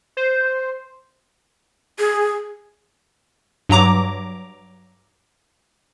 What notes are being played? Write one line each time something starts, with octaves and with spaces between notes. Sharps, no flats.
C5
G#4
G2 F#3 A#5 D6